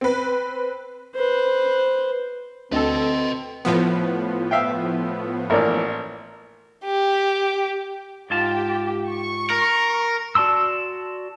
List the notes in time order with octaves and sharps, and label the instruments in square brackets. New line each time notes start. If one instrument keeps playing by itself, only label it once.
[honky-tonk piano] C4 B4
[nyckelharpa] B4 C5
[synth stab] D2 A4 [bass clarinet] C4 [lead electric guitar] B4 D#5
[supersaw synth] A2 F3 B3
[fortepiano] E5 F5 G5
A1 A#3 D5
[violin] G4
[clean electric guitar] G#2 F4 A5 [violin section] G4
[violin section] C#6
[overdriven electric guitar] A#4
[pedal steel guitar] F#4 D5 A5 C6 E6